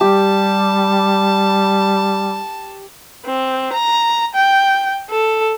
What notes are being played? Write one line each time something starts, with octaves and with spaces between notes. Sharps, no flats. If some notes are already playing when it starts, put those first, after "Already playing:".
G3 G4 A5
C4
A#5
G5
A4